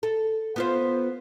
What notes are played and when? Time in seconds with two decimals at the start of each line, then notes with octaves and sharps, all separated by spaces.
0.03 A4
0.56 B3 F4 C5